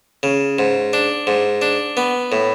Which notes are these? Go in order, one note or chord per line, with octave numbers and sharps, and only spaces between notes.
C#3
G#2
D4
G#2
D4
B3
A2